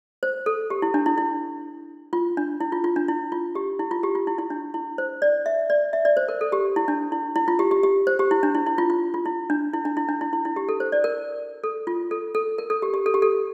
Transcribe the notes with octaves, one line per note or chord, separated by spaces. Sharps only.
C5
A4
G4
E4
D4
E4
E4
F4
D4
E4
F4
F4
D4
E4
F4
G4
E4
F4
G4
F4
E4
E4
D4
E4
C5
D5
E5
D5
E5
D5
C5
A#4
A4
G4
E4
D4
E4
E4
F4
G4
G4
G4
C5
G4
E4
D4
E4
E4
F4
F4
F4
E4
D4
E4
D4
E4
D4
E4
E4
E4
G4
A4
C5
D5
A#4
A4
F4
A4
A4
A#4
A4
G4
G4
A4
G4
A4